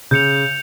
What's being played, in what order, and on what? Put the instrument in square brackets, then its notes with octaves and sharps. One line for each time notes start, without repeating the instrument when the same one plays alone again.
[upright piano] C#3 [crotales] G6 C#7 F7